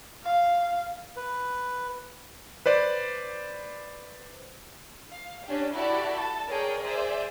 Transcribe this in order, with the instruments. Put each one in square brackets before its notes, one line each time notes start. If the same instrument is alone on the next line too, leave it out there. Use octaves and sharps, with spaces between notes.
[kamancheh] F5
[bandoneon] B4
[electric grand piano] B4 C5 D5
[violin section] F5
C#4 D4 G4
E4 F#4 G4 A4 D5
A4 A5
G#4 A#4 C#5 D5 G5
G#4 C5 D5 E5